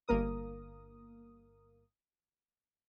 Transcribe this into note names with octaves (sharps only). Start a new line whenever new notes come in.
G1 A#3 A#4 D#6